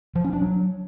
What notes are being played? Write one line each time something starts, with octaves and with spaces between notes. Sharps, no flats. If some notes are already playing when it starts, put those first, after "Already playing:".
F3
C#4
D4
F#3